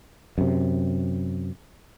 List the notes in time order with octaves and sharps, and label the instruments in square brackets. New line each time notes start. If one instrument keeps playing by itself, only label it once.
[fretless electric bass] F#2 C3